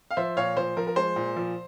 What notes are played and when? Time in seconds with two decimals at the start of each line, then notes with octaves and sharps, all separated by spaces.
0.11 F5
0.17 F3 C5 E5
0.37 A#2 C#5 F5
0.57 F3 C5
0.77 F3 A#4
0.87 A#4
0.96 G#3 C5
1.16 A#2
1.36 F3